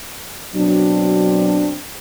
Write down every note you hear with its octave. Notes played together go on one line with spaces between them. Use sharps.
B2 F#3 C4 D4